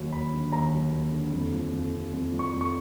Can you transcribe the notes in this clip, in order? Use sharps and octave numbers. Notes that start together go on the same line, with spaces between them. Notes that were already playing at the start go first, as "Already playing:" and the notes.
Already playing: D#2 F#3
D#2 B5
D3
D#2 A#5
F#3
D#2
D3
F2
F3
F2
C3
F2
F3
C#6
F2
C#6